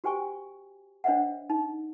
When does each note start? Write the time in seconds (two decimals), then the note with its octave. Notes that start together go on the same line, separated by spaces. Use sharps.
0.04 F#4 G4 C5 G5 G#5 C#6
1.04 D4 C5 C#5 D#5 E5 F#5
1.50 D#4